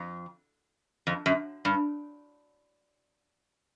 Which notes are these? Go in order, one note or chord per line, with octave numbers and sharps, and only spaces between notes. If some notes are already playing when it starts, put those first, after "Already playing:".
Already playing: F2
F2
F#2
G2